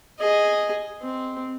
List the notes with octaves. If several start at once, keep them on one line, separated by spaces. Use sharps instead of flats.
G#4 D#5
C4